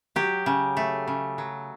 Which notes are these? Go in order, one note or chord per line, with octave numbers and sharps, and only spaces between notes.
F#3 G4
C#3
A3
C#3
F#3